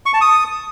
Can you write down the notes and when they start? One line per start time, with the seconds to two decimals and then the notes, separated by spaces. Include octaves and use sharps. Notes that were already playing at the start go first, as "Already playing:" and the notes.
0.06 C#6
0.14 A5
0.21 D#6